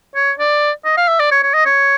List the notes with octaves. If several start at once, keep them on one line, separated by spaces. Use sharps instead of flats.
C#5
D5
D#5
F5
E5
D5
C#5
C#5
D#5
C#5